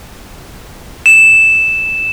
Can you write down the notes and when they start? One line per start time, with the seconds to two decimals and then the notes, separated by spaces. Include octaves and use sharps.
1.06 E7